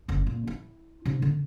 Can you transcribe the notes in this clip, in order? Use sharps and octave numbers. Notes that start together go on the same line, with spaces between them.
F#1 D3
A#2
E4
C3 D#4
D3